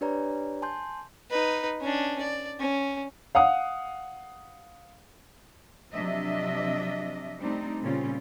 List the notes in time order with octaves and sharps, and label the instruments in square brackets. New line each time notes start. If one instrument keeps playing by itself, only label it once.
[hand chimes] D4 G4 B4 C#5 D5 A#5
G#5 A5 C6 G6
[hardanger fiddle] D#4 B4
C#4 D4
D5
C#4
[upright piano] F5 F#5 D#6
[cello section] C3 F3 F#3 D4 D#5 E5
G3 A3 C4 D4 D#4
A#2 C#3 G3 C4 C#4 F4